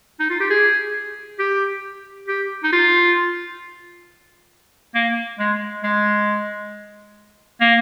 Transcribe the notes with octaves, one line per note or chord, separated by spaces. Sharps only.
D#4
F4
G4
G#4
G4
G4
D#4
F4
A#3
G#3
G#3
A#3